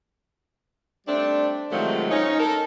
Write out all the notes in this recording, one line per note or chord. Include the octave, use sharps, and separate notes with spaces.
G3 A3 C4 D4
C3 D#3 F3 F#3 G#3 A3
C#4 D#4
A4 A#4